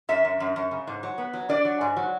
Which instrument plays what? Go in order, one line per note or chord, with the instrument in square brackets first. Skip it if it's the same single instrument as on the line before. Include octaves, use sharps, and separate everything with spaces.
[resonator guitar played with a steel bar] F#2 E5
F#2
F#2
F#2
C#3
G#2
F#3
B3
F#3
D4 D5
F#3
G#2
F#3